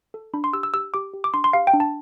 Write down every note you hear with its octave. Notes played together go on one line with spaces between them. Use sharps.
A4
D4 B5
C6
G4 E6
E6
G4 E6
G4 D6
G4
D6
D4 C6
C6
G4 F5
G5
D4
A5